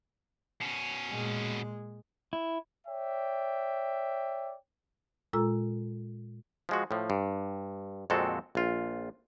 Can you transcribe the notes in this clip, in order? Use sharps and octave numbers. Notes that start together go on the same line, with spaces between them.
B2 C#4
A#2 G#3
E4
C#5 D5 E5 G5
A#2 G#3 F4 A4 A#5 E6
F3 G#3 F#4
A2 F3
G2
F2 A#2 G#3 C4 F#4 A4
A#1 F4